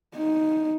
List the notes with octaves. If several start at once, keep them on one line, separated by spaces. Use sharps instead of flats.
D#4